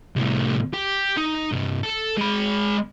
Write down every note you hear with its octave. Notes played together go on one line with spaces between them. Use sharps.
C2 A2
G4
D#4
C2 G2
A4
G#3 B5